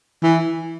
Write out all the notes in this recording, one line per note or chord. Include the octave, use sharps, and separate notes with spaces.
E3